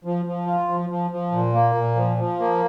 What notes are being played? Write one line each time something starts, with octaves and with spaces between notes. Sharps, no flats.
F3
F3
F4
F3
F3
F3
A#2
A#3
A#2
F3
F3
A#3